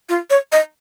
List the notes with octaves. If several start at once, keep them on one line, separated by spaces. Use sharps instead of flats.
F4
C#5
D#5